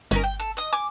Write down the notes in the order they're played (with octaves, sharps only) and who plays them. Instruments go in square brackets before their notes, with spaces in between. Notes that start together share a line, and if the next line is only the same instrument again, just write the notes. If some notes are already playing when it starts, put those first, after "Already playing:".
[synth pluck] G1 [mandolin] C#4 D#4 A#4
[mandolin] G5
A4
D#5 D#6
[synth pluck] G#5 [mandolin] D6